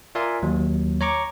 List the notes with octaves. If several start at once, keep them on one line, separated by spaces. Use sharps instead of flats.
F4 A#4 D5 E5 G#5 C6
D#2 F#3
C#5 A#5 C#6 D6